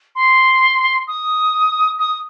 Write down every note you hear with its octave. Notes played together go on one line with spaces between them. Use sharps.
C6
D#6
D#6